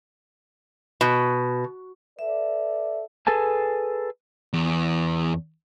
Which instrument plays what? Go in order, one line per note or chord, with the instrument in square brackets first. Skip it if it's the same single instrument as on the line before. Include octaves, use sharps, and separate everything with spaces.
[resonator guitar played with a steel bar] B2
[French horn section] A4 B4 D5 [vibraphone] E5
[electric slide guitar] G#4 A4 B4 G#5 A5
[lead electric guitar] E2